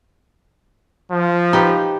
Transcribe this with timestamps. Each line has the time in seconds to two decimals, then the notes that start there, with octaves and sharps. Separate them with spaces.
1.11 F3
1.53 D#4 G4 B4